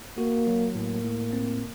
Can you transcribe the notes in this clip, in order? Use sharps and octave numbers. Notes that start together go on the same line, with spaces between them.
A#3 F#4
F#3
A2 A#3
A2
C4